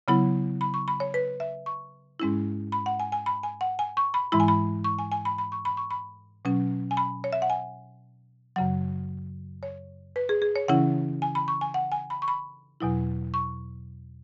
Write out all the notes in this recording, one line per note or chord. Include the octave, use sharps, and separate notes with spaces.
C#3 F#3 B3 E4 B5
B5
C#6
B5
C#5
B4
E5
C#6
G#2 G#3 C#4 E4
B5
F#5
G#5
G#5
B5
G#5
F#5
G#5
C#6
B5
G#2 E3 G#3 E4 B5
G#5
B5
C#6
G#5
G#5
B5
B5
C#6
B5
C#6
B5
B2 F#3 C#4
G#5
B5
C#5
E5
F#5
G#5
F#2 C#3 F#3 F#5
C#5
B4
G#4
G#4
C#5
C#3 E3 C#4 E4 F#5
G#5
B5
C#6
G#5
F#5
G#5
B5
C#6
B5
E2 B2 F#3 E4
C#6